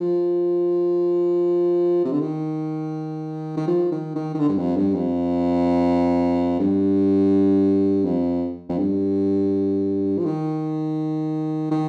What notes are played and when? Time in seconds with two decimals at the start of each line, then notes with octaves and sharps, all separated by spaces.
0.01 F3
2.05 C3
2.13 D3
2.20 D#3
3.57 D#3
3.67 F3
3.92 D#3
4.15 D#3
4.34 D#3
4.39 D3
4.49 G2
4.57 F2
4.76 G2
4.94 F2
6.59 G2
8.05 F2
8.69 F2
8.78 G2
10.19 F3
10.25 D#3
11.71 D#3